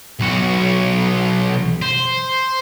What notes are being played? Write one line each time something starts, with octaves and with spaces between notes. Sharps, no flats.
B1 F#4
C5